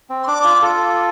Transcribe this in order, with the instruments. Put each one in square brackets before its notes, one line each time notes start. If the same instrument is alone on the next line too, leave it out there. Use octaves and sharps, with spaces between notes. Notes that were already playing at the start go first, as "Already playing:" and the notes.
[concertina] C4
[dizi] C6
[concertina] D4 [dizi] D6
[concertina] F4
F4 A4